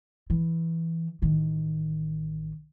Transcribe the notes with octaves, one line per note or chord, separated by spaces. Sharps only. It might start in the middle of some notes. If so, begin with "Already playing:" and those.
E3
A1 D#3